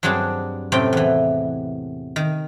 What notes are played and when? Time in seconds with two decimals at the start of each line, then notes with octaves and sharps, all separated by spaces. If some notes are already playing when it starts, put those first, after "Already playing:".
0.03 G2 F#3 C4 D4 G#4
0.72 F#2 A2 C3 C4 G5
0.93 E2 E3
2.16 D#3